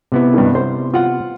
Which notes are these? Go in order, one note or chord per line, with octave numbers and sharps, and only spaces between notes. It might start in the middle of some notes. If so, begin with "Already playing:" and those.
C3 B3 E4
G2 B2 D#3
C5
F4 F#5